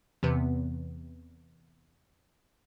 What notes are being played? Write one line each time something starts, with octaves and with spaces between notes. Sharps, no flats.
E2 C3 B3